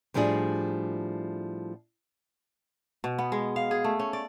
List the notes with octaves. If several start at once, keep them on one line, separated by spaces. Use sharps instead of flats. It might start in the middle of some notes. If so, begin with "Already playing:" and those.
A2 F3 G3 D4 G#4
B2
B3
G#3
F5
G#4
A3
C#4
D5